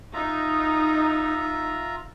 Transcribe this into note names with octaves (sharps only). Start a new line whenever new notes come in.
D#4 F4 E5 A#5